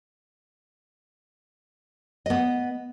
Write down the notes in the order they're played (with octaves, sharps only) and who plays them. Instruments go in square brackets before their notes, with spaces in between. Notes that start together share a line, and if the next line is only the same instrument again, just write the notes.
[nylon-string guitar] B3 D#5